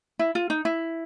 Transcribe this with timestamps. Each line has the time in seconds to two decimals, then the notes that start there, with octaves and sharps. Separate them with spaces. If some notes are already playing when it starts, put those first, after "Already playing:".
0.19 E4
0.35 F4
0.50 D#4
0.65 E4